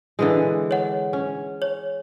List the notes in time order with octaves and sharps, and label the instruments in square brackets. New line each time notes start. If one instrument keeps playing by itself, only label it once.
[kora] D3 E3 G#3
[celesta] C#5 F#5
[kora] C#4
[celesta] C#5